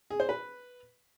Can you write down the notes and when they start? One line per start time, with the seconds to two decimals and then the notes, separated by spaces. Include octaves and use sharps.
0.10 G#4
0.20 C5
0.29 B4